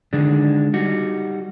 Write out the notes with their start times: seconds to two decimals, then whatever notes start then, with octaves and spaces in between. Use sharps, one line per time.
0.13 D3 D#3 G#3 D4
0.74 G3 D#4 F#4